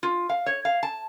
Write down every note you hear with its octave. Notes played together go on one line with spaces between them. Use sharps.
F4
F5
C#5
F5
A5